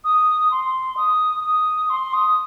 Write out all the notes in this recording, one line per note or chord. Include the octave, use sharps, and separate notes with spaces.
D#6
C6
D#6
D#6
C6
D#6